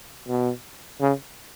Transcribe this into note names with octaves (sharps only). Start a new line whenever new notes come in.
B2
C#3